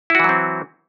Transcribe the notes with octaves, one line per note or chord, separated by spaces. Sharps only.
E3 F#3 C4 E4 F#4